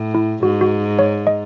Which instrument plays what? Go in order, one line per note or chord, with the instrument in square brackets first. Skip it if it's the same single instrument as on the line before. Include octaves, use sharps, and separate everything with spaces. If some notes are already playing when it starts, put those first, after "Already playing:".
Already playing: [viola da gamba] A2
[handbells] E4
[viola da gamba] G#2 [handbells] F#4
[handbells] F#4
C#5
D#5